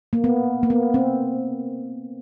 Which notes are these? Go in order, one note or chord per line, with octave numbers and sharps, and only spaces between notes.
A#3
B3
A#3
B3
C4